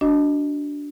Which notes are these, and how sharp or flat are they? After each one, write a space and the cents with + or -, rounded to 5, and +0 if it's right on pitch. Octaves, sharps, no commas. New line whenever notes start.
D4 -15 F#4 +10 D#5 +0